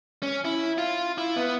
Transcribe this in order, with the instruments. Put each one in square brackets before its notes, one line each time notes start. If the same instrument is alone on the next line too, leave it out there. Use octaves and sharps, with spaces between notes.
[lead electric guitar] C#4
E4
F4
E4
B3